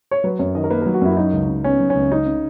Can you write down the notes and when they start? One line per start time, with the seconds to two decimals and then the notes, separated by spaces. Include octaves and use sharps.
0.11 C#5
0.24 F#3 B4
0.39 F#2 C#5
0.55 D#3 D#5
0.64 A#4
0.70 A#3 B4
0.82 A#4
0.86 F#3
0.94 F#4
1.02 F#2 E4
1.17 F#3 D#4
1.33 C#2
1.49 C#3
1.64 B3 C#4
1.80 F#3
1.90 C#4
1.95 C#2
2.11 C#4 D#4
2.26 C#3